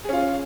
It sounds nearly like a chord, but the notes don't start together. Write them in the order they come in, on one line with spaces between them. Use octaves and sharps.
G#4 C#4 F4